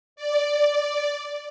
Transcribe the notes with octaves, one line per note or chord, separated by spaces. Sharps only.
D5